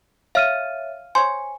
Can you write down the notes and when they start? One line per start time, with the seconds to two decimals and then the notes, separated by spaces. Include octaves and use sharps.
0.35 C#5 E5 F5 F6 D#7
1.15 C5 C#5 G#5